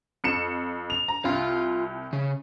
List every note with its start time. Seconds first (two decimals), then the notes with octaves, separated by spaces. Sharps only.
0.24 F2 C#7 E7
0.90 F7
1.08 A#5
1.25 C2 F4 F5
2.13 C#3